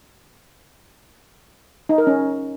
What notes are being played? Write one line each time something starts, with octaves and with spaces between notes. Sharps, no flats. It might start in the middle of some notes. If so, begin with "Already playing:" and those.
D#4
A#4
C#4